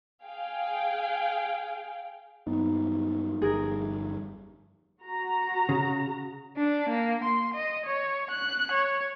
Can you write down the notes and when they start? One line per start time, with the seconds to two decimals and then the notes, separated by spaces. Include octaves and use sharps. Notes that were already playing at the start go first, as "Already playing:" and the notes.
0.23 G#4 F5 G5
2.47 G2 F#3 B3 D#4
3.42 G1 F2 G3 G#4 A#4
5.02 F#4 A#5
5.69 C#3
6.57 D4
6.90 A#3
7.24 C6
7.54 D#5
7.86 C#5
8.31 F#6
8.72 C#5